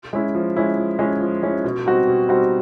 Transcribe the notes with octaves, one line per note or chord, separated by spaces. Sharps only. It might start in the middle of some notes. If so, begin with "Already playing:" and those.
G#3 C#4 E4
F3
G#3 C#4 E4
F3
G#3 C#4 E4
F3
G#3 C#4 E4
B2
G3 C4 D#4 F#4
B2
G3 C4 D#4 F#4